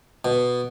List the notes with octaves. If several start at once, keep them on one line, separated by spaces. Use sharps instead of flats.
B2